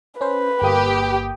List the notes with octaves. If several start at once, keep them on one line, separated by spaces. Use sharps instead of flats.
C#4 B4 C5
G1 A#3 G4 D#6